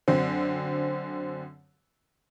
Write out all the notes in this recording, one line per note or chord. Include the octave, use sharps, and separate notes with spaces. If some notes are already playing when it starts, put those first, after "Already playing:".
F#2 D3 C4